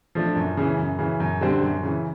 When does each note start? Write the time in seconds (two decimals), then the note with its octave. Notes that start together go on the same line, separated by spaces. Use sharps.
0.15 F3 A3 D4
0.36 F#2
0.57 C#3 E3
0.78 F#2
0.99 C#3 E3
1.20 F#2
1.41 D3 G3 C4
1.62 F#2
1.83 C#3 E3